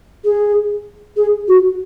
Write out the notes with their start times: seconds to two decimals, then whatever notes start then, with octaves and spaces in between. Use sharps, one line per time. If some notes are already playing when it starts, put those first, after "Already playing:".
0.25 G#4
1.17 G#4
1.48 F#4